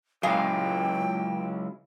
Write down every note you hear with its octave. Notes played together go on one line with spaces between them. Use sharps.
C#2 G2 A#2 F#3 G#3 E4 F5 G5